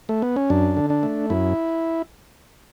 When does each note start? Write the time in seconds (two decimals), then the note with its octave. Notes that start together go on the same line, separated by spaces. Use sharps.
0.09 A3
0.22 B3
0.36 C#4
0.50 F#2 D4
0.77 D3
0.90 D4
1.03 A3
1.30 F#2 E4